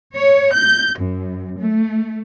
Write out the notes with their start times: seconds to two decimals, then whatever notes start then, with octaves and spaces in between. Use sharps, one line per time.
0.14 C#5
0.55 G6
0.98 F#2
1.58 A3